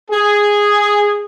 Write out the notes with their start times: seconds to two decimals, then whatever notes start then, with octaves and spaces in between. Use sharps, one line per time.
0.11 G#4